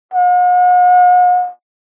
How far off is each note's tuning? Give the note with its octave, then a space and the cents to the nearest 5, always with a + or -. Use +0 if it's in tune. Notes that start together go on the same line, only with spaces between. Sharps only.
F#5 -45